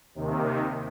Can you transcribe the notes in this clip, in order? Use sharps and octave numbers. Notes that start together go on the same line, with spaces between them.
D#2 C3 D#3